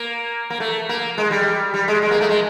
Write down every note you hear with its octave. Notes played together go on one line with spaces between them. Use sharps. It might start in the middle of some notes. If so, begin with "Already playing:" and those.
Already playing: A#3
A#3
A3
A#3
G#3
G3
G3
G#3
G#3
A#3
A3
G#3